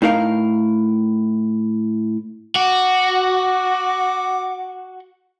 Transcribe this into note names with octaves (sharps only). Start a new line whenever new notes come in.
A2 D#4 A#4 F5
F#4 D6